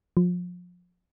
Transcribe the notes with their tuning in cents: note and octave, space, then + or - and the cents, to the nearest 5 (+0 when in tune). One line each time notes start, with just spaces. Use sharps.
F3 +30